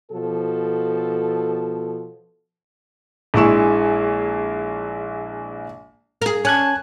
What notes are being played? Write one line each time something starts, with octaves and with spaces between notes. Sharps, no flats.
B2 F3 A4
A#1 G#3 E4 C#6 E7
G#4 A#4
C#4 G#5 A5 F#6 G#6